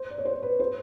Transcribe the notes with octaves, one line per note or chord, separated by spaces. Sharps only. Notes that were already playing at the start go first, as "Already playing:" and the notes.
Already playing: C5
D5
C#5
C5
B4
C5